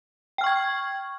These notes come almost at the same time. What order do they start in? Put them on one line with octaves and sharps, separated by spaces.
G5 F6 C#6 G#6